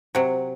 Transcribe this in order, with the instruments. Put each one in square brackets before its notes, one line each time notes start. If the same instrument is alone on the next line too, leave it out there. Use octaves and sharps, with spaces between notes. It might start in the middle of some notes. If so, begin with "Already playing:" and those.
[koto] C3 F#3